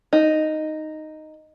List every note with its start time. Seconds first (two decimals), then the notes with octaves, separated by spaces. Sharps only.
0.13 D#4